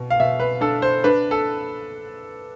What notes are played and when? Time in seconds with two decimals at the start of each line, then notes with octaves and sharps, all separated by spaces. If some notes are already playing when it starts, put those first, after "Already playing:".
Already playing: B2
0.10 F5
0.20 B2 E5
0.40 B4
0.61 D4 A4
0.82 C5
1.04 D4 B4
1.31 A4